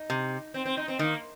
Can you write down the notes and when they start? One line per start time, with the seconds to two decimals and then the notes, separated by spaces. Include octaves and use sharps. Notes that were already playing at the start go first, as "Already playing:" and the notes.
Already playing: D#4
0.10 C3
0.54 C4
0.65 C4
0.77 D#4
0.88 C4
0.99 D#3 A#3